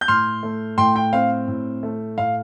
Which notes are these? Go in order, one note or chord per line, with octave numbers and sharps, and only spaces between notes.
G6
A2 C6 F6
A3
A2 G5 C6
G5
C4 F5
A2
A3
A2 F5